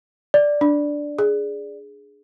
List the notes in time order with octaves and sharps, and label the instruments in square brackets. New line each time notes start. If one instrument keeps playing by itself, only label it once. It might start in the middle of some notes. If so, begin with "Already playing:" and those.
[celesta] D5
[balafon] D4
G#4